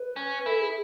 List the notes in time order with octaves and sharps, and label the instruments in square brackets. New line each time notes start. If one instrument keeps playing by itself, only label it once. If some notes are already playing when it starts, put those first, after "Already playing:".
Already playing: [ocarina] B4
[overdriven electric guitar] C#4
[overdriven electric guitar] E4 [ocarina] A4
[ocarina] G#4